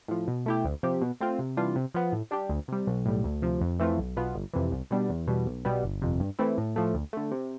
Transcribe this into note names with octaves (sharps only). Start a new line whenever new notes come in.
A2 F3
B2
A3 E4 G4
D2
C3 F3 C4 G4
B2
A3 C4 F4
C3
E3 G3 D4 F4
C3
F3 B3
A2
G3 D4 G4
D2
C3 G3
B1
A2 G3
D2
C3 F3
F2
E3 A3 C4 F4
B1
B2 B3 F4
G1
F2 C3 E3
C2
B2 G3 B3 D4
E2
B2 G3
B1
B2 G3 B3
G1
F2 C3
G2
E3 A3 C4 E4
A2
F3 A3
D2
D3 A3
C3